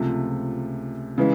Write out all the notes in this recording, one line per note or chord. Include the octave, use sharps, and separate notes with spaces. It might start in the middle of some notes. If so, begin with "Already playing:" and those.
Already playing: C#2 C3 F3 A3
C#3 E3 G#3